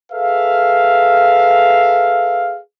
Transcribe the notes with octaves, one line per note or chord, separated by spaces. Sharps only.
G#4 A4 B4 E5 F5